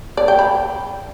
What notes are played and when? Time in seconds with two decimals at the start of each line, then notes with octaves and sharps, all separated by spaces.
0.17 D5
0.28 G5
0.39 B5